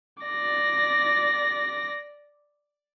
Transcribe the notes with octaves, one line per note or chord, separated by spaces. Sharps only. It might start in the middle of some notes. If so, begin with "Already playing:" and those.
D5 A#6